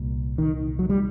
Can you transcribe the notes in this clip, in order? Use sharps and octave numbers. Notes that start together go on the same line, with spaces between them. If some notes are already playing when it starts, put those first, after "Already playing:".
Already playing: C2 A#2
D#3
F#3
G3